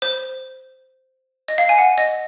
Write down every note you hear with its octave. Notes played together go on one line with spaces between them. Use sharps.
C5
D#5
F5
G#5
F#5
D#5